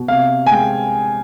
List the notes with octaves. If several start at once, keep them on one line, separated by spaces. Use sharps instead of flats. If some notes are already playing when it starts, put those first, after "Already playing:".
Already playing: B2
C3 F5
G#5
G#3 G5